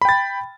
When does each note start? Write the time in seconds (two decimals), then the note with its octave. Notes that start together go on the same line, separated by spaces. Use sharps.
0.02 B5
0.05 G5
0.09 A6